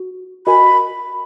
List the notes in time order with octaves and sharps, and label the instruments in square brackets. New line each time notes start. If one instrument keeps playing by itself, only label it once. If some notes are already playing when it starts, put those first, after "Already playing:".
Already playing: [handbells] F#4
[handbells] F#4 A#4 D#5 G#5 [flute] B5